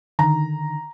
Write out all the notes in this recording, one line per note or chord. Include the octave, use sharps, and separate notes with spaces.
D3 D#3 A#5